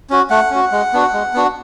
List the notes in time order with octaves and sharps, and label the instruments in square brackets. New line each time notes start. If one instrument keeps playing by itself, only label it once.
[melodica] C#4 F#4
A3 F#5
C#4 F#4
G#3
B3 D4 F#4
G#3
B3 D4 F#4